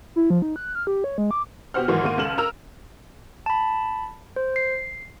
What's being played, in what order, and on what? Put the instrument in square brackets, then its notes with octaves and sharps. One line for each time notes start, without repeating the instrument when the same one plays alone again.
[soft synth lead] E4
F3
D#4
F#6
F6
G4
C#5
G#3
D6
[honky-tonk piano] B2 G4 C5 F#5 F6
G#2 D#3 E3 F#3
G#2 D#3 A#3 D#7
C#2 A4 F6 E7 F#7
A#4 A#5 E6 F6 F7
[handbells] A5 B5
C5
C7